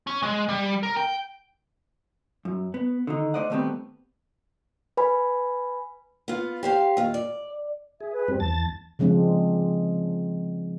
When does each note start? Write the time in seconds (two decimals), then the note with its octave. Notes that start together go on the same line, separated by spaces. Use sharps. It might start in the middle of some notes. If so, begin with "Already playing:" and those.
0.07 C#4
0.23 G#3
0.49 G3
0.83 A#4
0.97 G5
2.45 F#2
2.74 B3
3.07 D3 D#3 D#4
3.34 A3 C5 D5 D#5 F#5
3.50 D#3 G3 A3 B3 C4
4.97 B4 G#5 B5
6.28 B3 F4
6.63 G4 C5 F5
6.97 D#2 F4
7.14 D5
8.01 G#4 E5
8.12 B4
8.28 G2 G3 C4
8.40 E2 A5 A6
8.99 C#3 F3 G#3 C4 D4